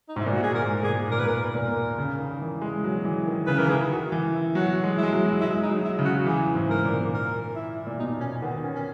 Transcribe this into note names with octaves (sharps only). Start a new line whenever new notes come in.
D#4
G#2 E4
A#2
F#4
G#4
G#2 A#4
A#2 G#4
A#2 A#4
B4
A#4
A#2 A#4
C#3
D#3
E3
G#3
F#3
E3
D#3
C#3 B4
E3 A#4
D#3 G#4
F#4
E3
E4
F#3 F#4
G#3
E4
G#3
F#3
G#3 E4
D#4
F#3
E4
C#3
F#4
E3 G#4
G#2
A#4
A#2
A#4
E4
A#2
B2 D#4
C#4
D#3 B3
C#4
C#4